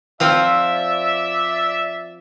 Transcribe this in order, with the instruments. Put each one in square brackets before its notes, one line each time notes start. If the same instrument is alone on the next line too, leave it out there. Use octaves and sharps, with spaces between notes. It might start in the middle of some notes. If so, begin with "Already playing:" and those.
[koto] F3 C4 F4 [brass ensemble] D5 E5